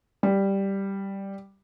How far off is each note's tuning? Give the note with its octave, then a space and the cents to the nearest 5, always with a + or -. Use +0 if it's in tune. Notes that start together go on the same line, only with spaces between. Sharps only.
G3 +0